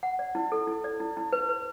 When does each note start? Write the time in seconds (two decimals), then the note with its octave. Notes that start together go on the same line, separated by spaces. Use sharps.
0.03 F#5
0.19 D5
0.35 E4
0.52 A4
0.67 E4
0.84 D5
1.00 E4
1.17 E4
1.33 B4
1.49 B4